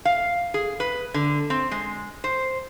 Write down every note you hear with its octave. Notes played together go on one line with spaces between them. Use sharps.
F5
G#4
B4
D3
C4
G#3
C5